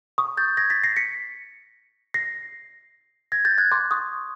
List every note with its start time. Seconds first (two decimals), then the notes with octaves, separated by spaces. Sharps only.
0.18 C#6 D#6
0.37 G6 A6
0.57 G#6 A#6
0.70 A6 B6
0.84 A#6 C7
0.96 B6 C#7
2.14 A#6 C7
3.32 G#6 A#6
3.45 G6 A6
3.58 F#6 G#6
3.72 C6 D6
3.91 C#6 D#6